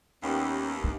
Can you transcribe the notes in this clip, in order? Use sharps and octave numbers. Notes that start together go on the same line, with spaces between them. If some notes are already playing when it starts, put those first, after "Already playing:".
D#2 G3 B3 C#4 E5
D4